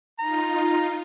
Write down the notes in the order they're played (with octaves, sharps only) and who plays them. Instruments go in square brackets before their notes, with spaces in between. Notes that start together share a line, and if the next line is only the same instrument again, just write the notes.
[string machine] D#4 F4 [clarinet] A#5